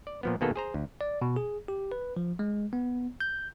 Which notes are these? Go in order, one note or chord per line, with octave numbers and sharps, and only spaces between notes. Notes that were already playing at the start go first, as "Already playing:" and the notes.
D5
A#2 F3 B3
B2 D#3 A#3 B3 G#4 A4
G#4 C5 A#5
D2
D5
B2
G#4
G4
B4
F3
G#3
B3
G6